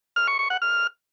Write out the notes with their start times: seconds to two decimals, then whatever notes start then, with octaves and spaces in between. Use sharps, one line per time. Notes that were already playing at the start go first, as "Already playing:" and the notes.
0.16 F6
0.28 C#6
0.39 C#6
0.50 F#5
0.62 F6